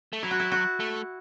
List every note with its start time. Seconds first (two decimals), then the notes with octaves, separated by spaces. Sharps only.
0.13 A3
0.23 F#3 E4
0.31 F#4
0.40 E4
0.52 F#4
0.80 A3